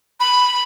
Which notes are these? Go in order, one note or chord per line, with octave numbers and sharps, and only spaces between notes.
B5